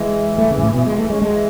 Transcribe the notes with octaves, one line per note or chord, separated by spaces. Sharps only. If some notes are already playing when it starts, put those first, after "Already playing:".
Already playing: E3 G#3
A3
C#3
G#2
A2
B2
E3 G#3
F#3
E3 A3
G#3 C#4
G#3 A3
F#3
E3